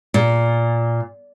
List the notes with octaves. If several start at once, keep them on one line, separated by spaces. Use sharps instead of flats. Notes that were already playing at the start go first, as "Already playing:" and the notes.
A#2